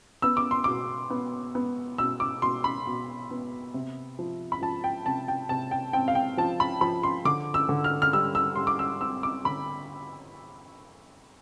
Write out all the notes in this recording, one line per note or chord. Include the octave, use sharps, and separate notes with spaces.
B3 E6
D6
C6
B2 D6
B3
B3
B2 E6
D6
B2 C6
B5
B2
B3
C3
F3
B5
F3 A5
G5
C3 A5
G5
C3 A5
G5
C4 G5
F5
G5
F3 A5
B5
F3 B5
C6
D3 D6
E6
D3
F6
F6
G3 E6
E6
G3 C6
D6
E6
C4 E6
D6
D3 B5